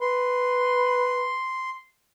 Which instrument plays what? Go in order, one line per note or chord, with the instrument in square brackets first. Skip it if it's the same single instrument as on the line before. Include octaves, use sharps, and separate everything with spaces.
[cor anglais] B4 [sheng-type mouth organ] C6